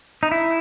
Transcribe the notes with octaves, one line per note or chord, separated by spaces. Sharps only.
D#4
E4